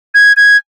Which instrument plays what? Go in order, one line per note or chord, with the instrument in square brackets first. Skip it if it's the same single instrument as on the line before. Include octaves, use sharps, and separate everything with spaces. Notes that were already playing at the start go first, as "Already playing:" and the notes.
[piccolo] G#6
G#6